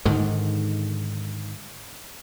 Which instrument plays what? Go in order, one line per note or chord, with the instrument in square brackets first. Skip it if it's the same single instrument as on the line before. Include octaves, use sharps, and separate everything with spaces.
[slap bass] G#2 D3 D#3